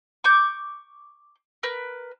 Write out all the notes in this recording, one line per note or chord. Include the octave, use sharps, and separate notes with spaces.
C#6 D6 G6
A#4 B4